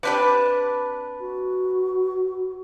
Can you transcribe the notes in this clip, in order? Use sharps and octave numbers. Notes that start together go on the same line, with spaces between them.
C3 D4 G4 B4
F#4